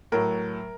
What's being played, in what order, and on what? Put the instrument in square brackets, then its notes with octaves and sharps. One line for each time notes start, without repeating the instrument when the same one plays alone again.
[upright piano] A2 F#3 A#4